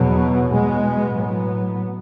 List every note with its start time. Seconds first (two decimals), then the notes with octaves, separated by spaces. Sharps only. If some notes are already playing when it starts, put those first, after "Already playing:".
Already playing: E2 B2 F#3 B3
0.51 B2 G#3 B3
1.15 A2 F#3 B3